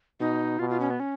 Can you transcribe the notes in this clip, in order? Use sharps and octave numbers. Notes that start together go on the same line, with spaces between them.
B2 D#4
B2 F4
F4
C#4
B3
C#4